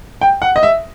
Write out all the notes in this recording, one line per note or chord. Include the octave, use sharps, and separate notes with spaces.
G5
F#5
D#5
E5